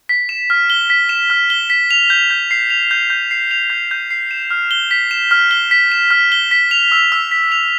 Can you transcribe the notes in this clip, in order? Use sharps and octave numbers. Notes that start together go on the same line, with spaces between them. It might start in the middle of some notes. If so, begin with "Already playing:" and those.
B6
E7
F6
G7
B6
E7
F6
G7
B6
F7
G6
G6
C7
F7
G6
G6
C7
F7
G6
G6
C7
E7
F6
G7
B6
E7
F6
G7
B6
E7
F6
G7
B6
F7
E6
E6
B6
F7